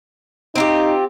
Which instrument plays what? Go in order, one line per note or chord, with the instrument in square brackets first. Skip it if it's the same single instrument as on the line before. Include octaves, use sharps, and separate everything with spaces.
[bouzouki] C4 F4 G4 [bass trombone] D#4